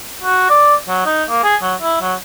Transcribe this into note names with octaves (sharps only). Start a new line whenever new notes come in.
F#4
D5
F#3
D#4
A#3
G#4
F#3
E4
F#3